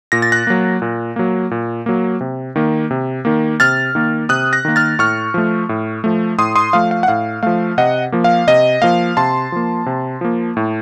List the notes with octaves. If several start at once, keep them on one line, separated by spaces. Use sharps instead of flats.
A#2 A#6
A6
F#6 A#6
F#3 A#3
A#2
F#3 A#3
A#2
F#3 A#3
C3
D#3 A#3
C3
D#3 A#3
C3 F6 A6
D#3 A#3
C3 D#6 F#6
F#6 A#6
D#3 A#3
F6 A6
A2 C#6 F6
F3 A3
A2
F3 A3
A2 C6 D#6
C6 D#6
F3 A3 F5
F5
F#5
A2 F5
F3 A3 F5
C3 D#5 F#5
F3 A#3
F5
C3 D#5
F3 A#3 F5
C3 A5 C6
F3 A#3
C3
F3 A#3
A2